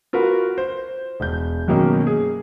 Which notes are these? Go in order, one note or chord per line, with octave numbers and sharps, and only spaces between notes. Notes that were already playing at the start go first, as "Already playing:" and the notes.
F4 F#4 A#4 B4
C5
E1 G6
F#2 B2 D#3 A#3 C#4
G#4